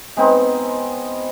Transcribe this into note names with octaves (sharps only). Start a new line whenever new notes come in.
G#3 B3 C4 D#4